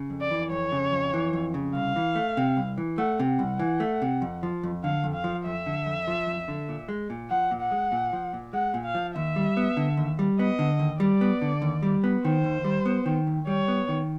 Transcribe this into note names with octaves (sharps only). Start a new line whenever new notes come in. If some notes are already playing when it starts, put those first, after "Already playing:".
Already playing: C#3
F2
D5
E3
F2 C#5
C#3
F2
E3
F2
C#3
C2 F5
E3
A3
C3
C2
E3
A3 F#5
C3
F#5
C2
E3
A3
C3
F2
F3
F2
D3 F5
F2
F5
F3
F2 E5
D3
F2
F3
F2
D3
A#2
G#3
A#2
F3 F#5
A#2
F#5
G#3
A#2
F3
A#2
G#3 F#5
A#2
F5
F3
D#2 E5
G3
B3
D3
D#2
G3
B3 D#5
D3
D#2
G3 D5
B3
D3
D#2
G3
B3
D#3 C5
D#2
G3
B3
D#3
D#2
G3 C#5
B3
D#3